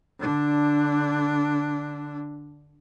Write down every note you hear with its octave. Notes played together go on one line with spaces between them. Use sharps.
D3 D4